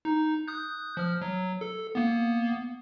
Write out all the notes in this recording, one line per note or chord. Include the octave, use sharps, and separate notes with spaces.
D#4
D#6 F#6 G6
F3 F6
F#3
A4
A#3 B3